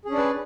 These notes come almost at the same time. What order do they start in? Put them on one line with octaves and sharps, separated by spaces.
G#4 C#4 D4 D5 B4